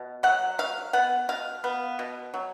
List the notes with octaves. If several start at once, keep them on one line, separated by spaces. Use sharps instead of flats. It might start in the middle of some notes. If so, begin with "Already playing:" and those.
Already playing: B2
F#3 F#5
F#3 F5
B3 F#5
B2 F5
B3
B2
F#3